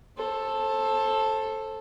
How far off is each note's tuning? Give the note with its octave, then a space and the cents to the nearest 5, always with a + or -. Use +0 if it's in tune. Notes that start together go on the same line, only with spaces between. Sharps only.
A4 +0 C5 +35